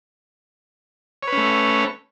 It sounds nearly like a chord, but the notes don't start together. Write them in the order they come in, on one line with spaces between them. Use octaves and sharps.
C#5 B4 C#4 A3